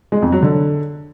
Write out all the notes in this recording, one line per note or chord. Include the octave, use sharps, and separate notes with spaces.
G#3
F2
F#3
D3